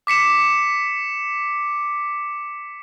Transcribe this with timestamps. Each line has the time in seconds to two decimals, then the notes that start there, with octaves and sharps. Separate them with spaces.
0.07 D6 B6 C#7 E7